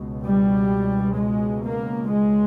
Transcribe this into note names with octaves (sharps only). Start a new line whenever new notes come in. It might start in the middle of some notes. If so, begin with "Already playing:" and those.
Already playing: C#2 B2
G3
G#3
A#3
G#3